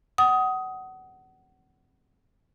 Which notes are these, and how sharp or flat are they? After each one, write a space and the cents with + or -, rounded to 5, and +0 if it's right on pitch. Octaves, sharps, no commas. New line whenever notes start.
F#5 +25 D#6 +15